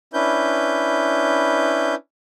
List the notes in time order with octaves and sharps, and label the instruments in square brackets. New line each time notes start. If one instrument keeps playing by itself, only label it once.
[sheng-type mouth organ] C#4 D4 E4 B4 G6